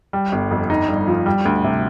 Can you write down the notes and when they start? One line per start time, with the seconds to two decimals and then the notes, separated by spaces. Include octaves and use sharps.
0.13 G3
0.32 G1
0.51 F2
0.70 D#4
0.88 G2
1.08 F3
1.26 G3
1.45 D2
1.64 C3